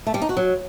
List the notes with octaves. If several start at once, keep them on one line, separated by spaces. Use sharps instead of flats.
A3
G3
D#4
F#4
F#3